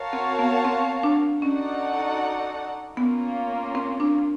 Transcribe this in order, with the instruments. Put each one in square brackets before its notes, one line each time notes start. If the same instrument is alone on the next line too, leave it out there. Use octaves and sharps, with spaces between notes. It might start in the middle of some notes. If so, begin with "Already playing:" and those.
Already playing: [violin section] F#4 A#4 C#5 F5 A5
[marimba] C4
B3
C4
D4
[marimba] C#4 [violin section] D#4 F#4 A4 D5 F#5
[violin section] A#3 C#4 F4 [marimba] B3
[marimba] C4
D4